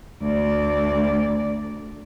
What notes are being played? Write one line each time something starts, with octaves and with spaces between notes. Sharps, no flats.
D2 D5